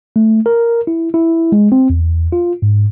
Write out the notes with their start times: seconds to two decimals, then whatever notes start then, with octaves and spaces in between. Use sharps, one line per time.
0.16 A3
0.46 A#4
0.87 E4
1.14 E4
1.52 G#3
1.72 C4
1.90 E2
2.32 F4
2.62 G#2